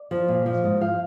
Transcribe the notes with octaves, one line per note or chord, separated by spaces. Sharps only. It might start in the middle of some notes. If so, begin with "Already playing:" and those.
Already playing: D5
F3
A#2
F3
G#2 D#5
F3 F5